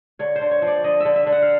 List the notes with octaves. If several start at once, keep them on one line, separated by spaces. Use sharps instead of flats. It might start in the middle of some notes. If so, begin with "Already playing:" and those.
D3 C#5
C5
D3
C#5
F3
D5
D3 D#5
D3 E5
E5
D3
F#5
F5